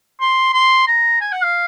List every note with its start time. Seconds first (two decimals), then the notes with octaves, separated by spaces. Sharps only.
0.21 C6
0.53 C6
0.87 A#5
1.21 G#5
1.32 F#5
1.43 F5